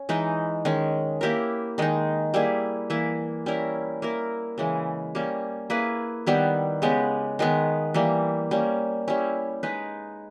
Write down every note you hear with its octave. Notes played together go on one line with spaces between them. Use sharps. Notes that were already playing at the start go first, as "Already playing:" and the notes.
Already playing: C#4
E3 G#3 D#4
D#3 G#3 C#4
A#3 E4 G4 A#4
D#3 G#3 D#4
G3 A#3 E4 G#4
E3 A#3 E4
G3 C#4 E4 A#4
A#3 E4 A#4
C#3 E3 G#3
G3 A#3 C#4
A#3 E4 G#4 B4
D#3 G3 B3 E4
C#3 G#3 B3 G4
D#3 G#3 B3
E3 G3 A#3
G3 A#3 C#4
G3 C#4 E4
G#3 D#4 G#4 B4